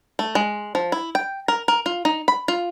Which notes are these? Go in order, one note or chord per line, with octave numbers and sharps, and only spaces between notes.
A3
G#3
F3
E4
G5
A#4
A#4
F4
D#4
B5
F4